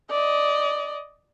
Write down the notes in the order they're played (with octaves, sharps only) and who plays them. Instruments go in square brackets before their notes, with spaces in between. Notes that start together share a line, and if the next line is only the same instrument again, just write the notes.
[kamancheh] D5 D#5